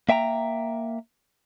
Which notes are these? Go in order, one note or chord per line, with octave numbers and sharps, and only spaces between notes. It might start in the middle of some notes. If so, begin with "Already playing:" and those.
A#3 E5 G5 A5 A#5